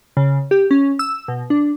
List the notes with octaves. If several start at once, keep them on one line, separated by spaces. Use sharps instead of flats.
C#3
G4
C#4
E6
B2
D4